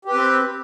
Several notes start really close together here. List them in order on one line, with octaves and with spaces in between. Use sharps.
G4 B4 C4